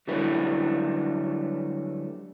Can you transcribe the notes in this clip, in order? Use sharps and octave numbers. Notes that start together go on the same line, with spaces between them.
D3 F#3 G3 A3 E4 B4